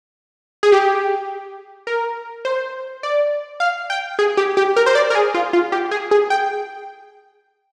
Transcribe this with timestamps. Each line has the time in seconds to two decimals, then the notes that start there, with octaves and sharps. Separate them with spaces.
0.63 G#4
0.72 G4
1.87 A#4
2.45 C5
3.03 D5
3.60 F5
3.90 G5
4.19 G#4
4.37 G4
4.57 G4
4.76 A#4
4.86 C5
4.95 D5
5.10 A#4
5.15 G#4
5.34 F4
5.53 F4
5.72 G4
5.91 G#4
6.11 G#4
6.30 G5